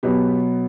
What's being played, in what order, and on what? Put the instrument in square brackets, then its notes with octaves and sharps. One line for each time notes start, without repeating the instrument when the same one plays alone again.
[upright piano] B2 F#3 B3 G4 B4